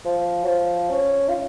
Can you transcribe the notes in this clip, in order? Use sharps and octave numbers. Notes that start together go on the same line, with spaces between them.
F3
F#3
F3
C#4
F4